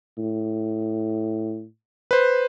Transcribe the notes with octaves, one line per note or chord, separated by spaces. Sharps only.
A2
B4 C5